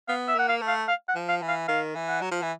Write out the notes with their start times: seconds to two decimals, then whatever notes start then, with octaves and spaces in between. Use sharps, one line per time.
0.08 B3 F5
0.28 E5
0.35 A#3 F#5
0.49 F5
0.62 A3
0.68 F5
0.88 F5
1.09 F#5
1.15 F3
1.29 F5
1.42 E3
1.48 F5
1.68 D#3 F5
1.95 E3
2.09 F#5
2.22 F#3
2.32 F3
2.42 E3